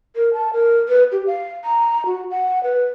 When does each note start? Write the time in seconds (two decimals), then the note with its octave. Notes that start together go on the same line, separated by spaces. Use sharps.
0.16 A#4
0.33 A5
0.53 A#4
0.88 B4
1.12 G4
1.27 F5
1.64 A#5
2.06 F#4
2.31 F#5
2.64 B4